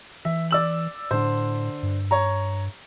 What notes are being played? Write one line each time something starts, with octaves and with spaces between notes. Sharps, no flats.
E3 E5
D5 E6 F#7
A2 D3 C5
G2
C#5 A#5